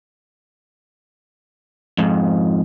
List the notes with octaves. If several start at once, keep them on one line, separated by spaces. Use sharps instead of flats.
F2 G#2